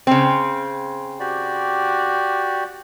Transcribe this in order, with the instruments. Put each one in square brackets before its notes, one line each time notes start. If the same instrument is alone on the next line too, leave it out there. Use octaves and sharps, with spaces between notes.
[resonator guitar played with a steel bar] C#3 C4
[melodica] F#4 G4 D5